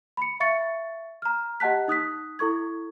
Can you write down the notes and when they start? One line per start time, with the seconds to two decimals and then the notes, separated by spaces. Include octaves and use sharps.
0.17 B5 C#7
0.40 E5 F5 C#6 A6 C#7
1.22 A#5 F6
1.60 G4 D#5 F#5 A5 F#6 B6
1.88 D#4 D#6 F#6 B6
2.39 E4 A4 C#6 G#6